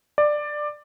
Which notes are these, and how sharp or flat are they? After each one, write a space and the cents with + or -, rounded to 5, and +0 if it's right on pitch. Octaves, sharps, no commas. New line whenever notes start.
D5 +15